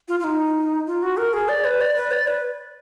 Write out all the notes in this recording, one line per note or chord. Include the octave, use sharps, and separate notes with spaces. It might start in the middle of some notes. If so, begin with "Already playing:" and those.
F4
F4
D#4
F4
F#4
A#4
G#4
D5
B4
D5
B4
D5
B4